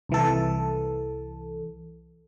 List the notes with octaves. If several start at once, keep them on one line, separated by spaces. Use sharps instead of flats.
C2 E3 A4